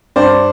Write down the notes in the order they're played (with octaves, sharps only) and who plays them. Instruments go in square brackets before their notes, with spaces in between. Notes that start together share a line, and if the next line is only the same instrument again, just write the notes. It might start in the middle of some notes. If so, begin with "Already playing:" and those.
[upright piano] G2 C5 D5